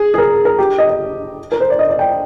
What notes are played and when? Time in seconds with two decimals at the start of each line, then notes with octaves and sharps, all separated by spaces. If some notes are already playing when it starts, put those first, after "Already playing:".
Already playing: G#4
0.14 G#4
0.18 A#4
0.45 A#4
0.58 G4
0.78 D#5
0.89 D#5
1.52 A#4
1.60 C5
1.70 D5
1.79 D#5
1.89 D5
1.99 G5